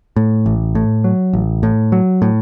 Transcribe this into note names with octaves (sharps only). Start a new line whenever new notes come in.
A2
A1
A2
F#3
A1
A2
F#3
A2